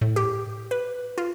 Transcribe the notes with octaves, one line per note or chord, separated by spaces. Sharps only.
A2
G4
B4
F4